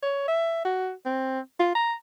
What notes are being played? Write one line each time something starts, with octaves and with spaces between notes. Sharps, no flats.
C#5
E5
F#4
C4
F4
A#5